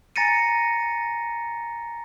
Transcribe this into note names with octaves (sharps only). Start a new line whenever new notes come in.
G#5 A#5 A6 A#6 C#7 D#7